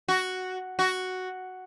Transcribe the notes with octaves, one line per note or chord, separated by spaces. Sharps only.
F#4
F#4